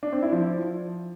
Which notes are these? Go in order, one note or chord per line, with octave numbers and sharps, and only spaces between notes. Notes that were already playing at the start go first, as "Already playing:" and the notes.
D4
C4
E4
F3